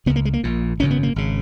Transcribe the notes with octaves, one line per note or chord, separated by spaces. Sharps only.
C#2 C#3 B3
A#3
G#3
A#3
A#1 A#2
G#1 F#2 C#3 C#4
B3
A#3
G#1 C#3